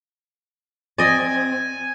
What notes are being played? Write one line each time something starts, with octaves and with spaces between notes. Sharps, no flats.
C4 D5 D#5 G#5